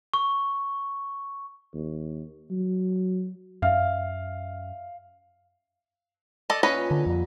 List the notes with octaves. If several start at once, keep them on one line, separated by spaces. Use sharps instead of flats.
C#6
D#2
F#3
F#2 E5 F5 F6
A4 D5 D#5
A#2 C#4 B4 D#5
D3 A#5
F2 F#3 G3